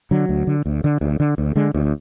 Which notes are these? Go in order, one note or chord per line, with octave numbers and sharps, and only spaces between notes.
D3 F#3
D2
D3
D2
D3
D2
D3
D2
D3 G#3
D2